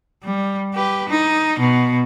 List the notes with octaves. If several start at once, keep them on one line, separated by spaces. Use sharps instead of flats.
G3
G4 B4
D#4
B2